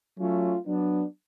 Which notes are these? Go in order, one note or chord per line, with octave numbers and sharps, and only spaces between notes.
F#3 A3 C#4 F4
F#3 B3 D4